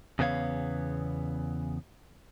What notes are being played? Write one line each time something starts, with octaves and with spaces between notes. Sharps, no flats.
E2 C#3 B3 F4 C#5 F5